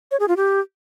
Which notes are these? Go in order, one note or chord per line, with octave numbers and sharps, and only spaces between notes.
C#5
G#4
F4
G4